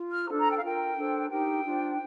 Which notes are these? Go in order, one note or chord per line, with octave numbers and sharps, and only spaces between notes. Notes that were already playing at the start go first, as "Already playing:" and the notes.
Already playing: F4
F6
D4 A4 C5 A#5
A#5
G5
F5
F4 A#4 G5
D4 A4 C5
D#4 G4 A#4 G5
D4 F4 C5